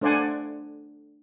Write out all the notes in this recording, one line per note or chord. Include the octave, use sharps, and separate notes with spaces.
A3 D4 C5 D5 F#5 G#5